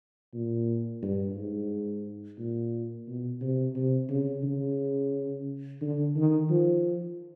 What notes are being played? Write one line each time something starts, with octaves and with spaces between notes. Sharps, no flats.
A#2
G2
G#2
A#2
B2
C3
C3
C#3
C#3
D3
D#3
F3